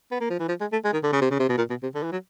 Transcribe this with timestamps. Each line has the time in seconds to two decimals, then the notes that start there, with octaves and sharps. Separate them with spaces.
0.11 B3
0.21 A#3
0.30 F3
0.39 E3
0.48 F3
0.61 G#3
0.72 A3
0.84 G#3
0.93 D#3
1.03 D3
1.12 C#3
1.21 C3
1.31 C#3
1.40 C3
1.49 B2
1.58 A#2
1.70 B2
1.83 C3
1.95 D3
2.03 E3
2.12 F#3